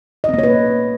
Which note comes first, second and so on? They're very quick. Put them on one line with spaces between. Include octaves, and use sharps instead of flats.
D#5 C4 A#3 C#5 B4